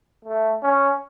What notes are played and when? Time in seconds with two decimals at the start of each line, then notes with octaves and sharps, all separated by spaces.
0.25 A3
0.63 C#4